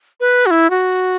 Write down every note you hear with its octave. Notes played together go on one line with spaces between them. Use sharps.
B4
F#4
E4
F#4